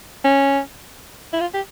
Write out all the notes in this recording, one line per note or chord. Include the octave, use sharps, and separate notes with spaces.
C#4
E4
F4
G4